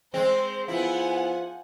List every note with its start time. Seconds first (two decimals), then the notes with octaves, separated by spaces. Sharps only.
0.14 G#3 C4 C5
0.68 F3 B3 E4 F#5 G#5